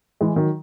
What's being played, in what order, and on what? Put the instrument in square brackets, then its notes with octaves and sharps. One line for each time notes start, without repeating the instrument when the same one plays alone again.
[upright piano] E3 G#3
D#3 F#3